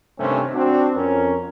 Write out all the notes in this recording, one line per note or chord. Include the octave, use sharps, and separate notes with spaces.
G2 C3 D#3 A3 C4 C#4
C4 D4 F#4
F2 C#4 A#4